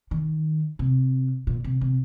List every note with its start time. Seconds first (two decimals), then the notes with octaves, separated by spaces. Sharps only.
0.11 D#3
0.79 C3
1.47 A#2
1.64 C3
1.81 C3